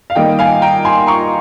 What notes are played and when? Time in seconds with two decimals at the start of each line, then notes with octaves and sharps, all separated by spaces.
0.10 F5
0.15 D#3 G3 A#3 D#5 G5
0.39 F5 G#5
0.62 G5 A#5
0.85 G#5 C6
1.07 A#5 C#6